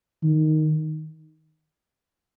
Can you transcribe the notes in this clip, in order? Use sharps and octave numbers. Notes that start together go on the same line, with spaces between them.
D#3